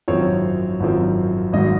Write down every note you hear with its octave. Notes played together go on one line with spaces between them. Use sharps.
G#1 F#2 F3 C4 C#5
G#1 F#2 F3 C4
G#1 G#2 F#3 D#5